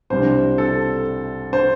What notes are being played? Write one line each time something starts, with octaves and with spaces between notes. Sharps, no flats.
C2 C3 G3 D4 C5
A4
C5